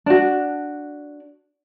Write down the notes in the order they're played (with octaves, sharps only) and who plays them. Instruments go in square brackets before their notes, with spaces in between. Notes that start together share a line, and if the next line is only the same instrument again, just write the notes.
[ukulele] D4 F#4